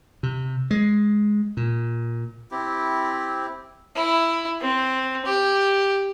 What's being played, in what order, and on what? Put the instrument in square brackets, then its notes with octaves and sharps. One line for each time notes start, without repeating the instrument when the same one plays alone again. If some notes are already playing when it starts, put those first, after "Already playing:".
[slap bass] C3
G#3
A#2
[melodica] C4 E4 G4
[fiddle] E4
C4
G4